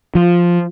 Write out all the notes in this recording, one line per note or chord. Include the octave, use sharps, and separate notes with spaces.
F3